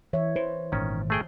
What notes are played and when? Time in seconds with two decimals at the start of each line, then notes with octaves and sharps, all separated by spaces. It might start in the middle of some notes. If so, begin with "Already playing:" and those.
0.13 E3 C#5 E5
0.36 E3 C5
0.72 G#1 A#2 D#3 C#4
1.10 A3 G#4 G5